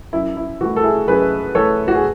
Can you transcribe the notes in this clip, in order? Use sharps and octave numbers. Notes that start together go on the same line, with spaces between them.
F#2 E4
E4
E3 A3 F#4
A4
E4 G#4
F#2 G#4 B4
E3 A3 A4 C#5
F#4
G#4